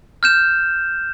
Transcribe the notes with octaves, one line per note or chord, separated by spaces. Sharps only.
F6 G6 E7